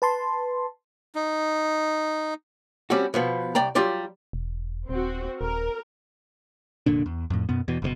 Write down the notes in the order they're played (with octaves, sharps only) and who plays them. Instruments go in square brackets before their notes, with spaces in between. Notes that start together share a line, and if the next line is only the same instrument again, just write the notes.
[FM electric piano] B4 A5 C6
[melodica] D#4
[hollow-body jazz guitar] G3 C4 C#4 F#4
B2 F3 B3
C2 D5 G5 A#5
F#3 G3 F4 G4 D5
[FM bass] E1
[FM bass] D#1 [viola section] C4 F#4
[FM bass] D#1 [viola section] A#4
[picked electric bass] F1 A#2 D3 D4
E2
F2 A2
F#2 B2 B3
E2 B2
F#1 G2 B2